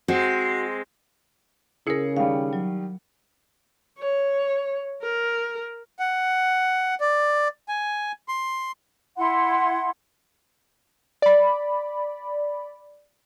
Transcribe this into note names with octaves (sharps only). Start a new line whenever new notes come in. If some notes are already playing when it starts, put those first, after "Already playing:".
G#3 C4 F#4
C#3 E4 G#4 A#4 C#7
D#3 G3 F5
F#3
C#5
A#4
F#5
D5
G#5
C6
E4 F#5 C6
D5 B5